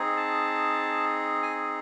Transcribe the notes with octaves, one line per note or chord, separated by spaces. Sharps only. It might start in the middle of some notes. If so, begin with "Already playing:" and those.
Already playing: C4 D#4 G#4
A5
G#5